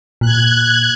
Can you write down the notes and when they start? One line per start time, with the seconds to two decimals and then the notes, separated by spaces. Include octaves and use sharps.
0.21 A#2 F#6 G#6